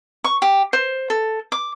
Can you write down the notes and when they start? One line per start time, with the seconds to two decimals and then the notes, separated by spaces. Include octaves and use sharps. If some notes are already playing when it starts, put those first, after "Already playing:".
0.24 C#6
0.42 G4
0.73 C5
1.10 A4
1.52 D6